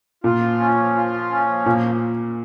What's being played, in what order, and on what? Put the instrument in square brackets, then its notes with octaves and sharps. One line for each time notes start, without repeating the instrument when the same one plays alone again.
[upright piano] A#2 [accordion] F4
[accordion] F3
C#4
F3
F4
F3
C#4
F3
[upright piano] A#2 [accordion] A#3